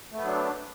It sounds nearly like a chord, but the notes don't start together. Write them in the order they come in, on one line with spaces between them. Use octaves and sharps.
A3 B3 F#3 D4